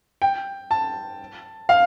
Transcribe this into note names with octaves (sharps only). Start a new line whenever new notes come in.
G5
A5
F5